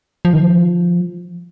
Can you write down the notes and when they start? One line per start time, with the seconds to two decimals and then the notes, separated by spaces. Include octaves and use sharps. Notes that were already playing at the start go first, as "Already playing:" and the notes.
0.25 F3
0.33 D#3
0.42 F3